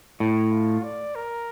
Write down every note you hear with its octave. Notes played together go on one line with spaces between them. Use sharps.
A2 E4
F4
D5
A#4